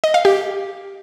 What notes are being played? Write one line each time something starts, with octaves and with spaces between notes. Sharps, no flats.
D#5
F5
G4